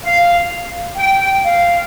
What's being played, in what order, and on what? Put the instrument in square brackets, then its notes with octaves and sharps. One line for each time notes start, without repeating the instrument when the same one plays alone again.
[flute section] F5
G5
F5